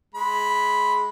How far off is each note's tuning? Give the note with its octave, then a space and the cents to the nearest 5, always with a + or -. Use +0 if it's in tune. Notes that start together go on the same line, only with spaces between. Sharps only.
G#3 +15 B5 +0